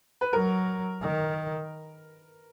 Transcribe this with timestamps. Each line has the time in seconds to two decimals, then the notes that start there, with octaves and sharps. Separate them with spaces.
0.21 B4
0.33 F#3 A#4
1.02 D#3